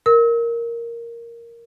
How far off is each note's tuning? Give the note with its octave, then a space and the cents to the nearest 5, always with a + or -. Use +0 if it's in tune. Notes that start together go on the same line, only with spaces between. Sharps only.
A#4 +0 E6 -40